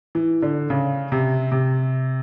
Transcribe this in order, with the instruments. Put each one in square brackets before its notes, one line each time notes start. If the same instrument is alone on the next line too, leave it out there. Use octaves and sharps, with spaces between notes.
[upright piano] E3
D3
C#3
C3
C3